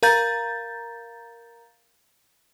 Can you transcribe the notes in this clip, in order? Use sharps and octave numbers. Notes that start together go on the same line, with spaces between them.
A#4 F5 A#5 G6 A6